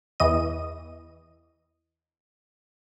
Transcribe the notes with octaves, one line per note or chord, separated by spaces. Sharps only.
E2 E3 D#5 D#7